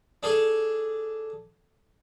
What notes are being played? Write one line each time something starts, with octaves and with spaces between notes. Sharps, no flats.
D4 G#4 A4